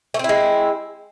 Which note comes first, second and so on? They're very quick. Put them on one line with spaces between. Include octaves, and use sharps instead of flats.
A3 C4 E4 G#3